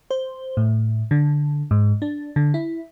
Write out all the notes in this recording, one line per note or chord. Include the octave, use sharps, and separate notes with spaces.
C5
A2
D3
G#2
D4
D3
E4